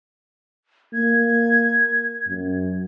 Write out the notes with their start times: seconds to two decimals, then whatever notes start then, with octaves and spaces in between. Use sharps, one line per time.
0.94 A#3 G#6
2.28 F#2